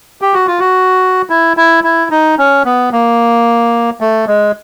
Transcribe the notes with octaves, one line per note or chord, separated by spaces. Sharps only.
G4
F#4
F4
F#4
E4
E4
E4
D#4
C#4
B3
A#3
A3
G#3